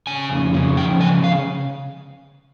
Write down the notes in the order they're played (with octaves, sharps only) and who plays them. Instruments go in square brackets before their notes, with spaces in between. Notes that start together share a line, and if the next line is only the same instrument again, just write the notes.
[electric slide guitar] C#3 G#5
F2
C#3
F3 G5
C#3 G#5
F5